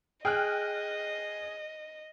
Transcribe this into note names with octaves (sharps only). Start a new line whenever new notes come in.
G#4 D#5 G5 F6 F#6